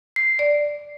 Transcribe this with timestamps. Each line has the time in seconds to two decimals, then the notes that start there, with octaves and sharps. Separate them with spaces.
0.16 C7
0.39 D5